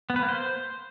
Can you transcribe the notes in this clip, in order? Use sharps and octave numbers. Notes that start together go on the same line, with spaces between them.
B3
B4
A#3
C5